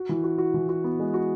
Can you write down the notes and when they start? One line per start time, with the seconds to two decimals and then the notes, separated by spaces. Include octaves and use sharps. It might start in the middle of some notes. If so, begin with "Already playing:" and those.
Already playing: F#4
0.09 E3
0.24 F#4
0.38 F#4
0.54 E3
0.69 F#4
0.84 B3
0.99 G#3
1.14 F#4